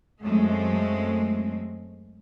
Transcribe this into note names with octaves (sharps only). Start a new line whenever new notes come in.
F#2 G#3 A3 C4